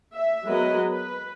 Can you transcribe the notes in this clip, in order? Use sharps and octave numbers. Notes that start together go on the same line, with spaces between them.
E5
F#3 G#3 B3 A#4 B4 D#5
B4